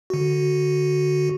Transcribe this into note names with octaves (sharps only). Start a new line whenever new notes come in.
D3 F#4